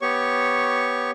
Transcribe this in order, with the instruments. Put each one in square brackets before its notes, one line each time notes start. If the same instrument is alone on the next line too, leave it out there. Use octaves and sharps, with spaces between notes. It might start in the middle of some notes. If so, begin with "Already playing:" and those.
[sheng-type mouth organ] B3 G4 C#5 C#6